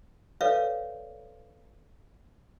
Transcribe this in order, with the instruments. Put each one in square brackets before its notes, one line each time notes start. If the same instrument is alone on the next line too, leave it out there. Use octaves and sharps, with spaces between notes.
[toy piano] A4 B4 C#5 D5 E5 F5